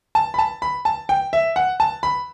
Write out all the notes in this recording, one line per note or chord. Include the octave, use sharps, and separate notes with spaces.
A5
B5
A5
B5
A5
G5
E5
F#5
A5
B5